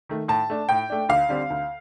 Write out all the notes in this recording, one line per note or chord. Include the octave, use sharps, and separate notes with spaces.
D#3 A3
A2 A5
A3 D4
A2 G5
A3 D4
D2 F5
D3 G3 C4
D2